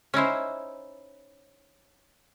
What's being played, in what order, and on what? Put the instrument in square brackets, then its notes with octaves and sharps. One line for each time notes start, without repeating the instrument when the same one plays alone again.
[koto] C#4 D#4 E4 C5